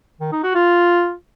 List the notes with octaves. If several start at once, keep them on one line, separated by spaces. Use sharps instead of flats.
D#3
D#4
F#4
F4